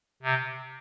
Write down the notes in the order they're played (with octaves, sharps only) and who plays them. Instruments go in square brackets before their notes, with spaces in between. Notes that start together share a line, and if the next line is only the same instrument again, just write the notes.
[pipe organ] C3